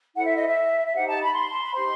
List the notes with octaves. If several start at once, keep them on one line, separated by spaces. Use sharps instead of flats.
E4 A4 C5 F#5
E5
D#5
E5
E5
D#4 G4 C5 F#5
A5
B5
C6
A5
B5
D#4 G4 C5 C6